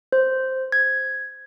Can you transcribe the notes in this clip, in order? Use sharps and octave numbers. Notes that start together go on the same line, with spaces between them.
C5
G#6